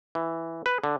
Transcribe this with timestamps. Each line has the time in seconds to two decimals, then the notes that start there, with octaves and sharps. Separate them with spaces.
0.15 E3
0.66 B4
0.84 D3